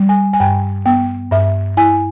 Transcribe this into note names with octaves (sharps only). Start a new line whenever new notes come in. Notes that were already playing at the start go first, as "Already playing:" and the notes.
Already playing: G3
G#5
G#5
G2 G5
B3 G5
G2 E5
E4 G#5